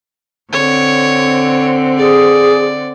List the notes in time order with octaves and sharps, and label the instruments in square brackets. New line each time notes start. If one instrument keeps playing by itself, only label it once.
[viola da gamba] D3 C4 [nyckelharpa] C#5
[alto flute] G#4 [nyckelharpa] D5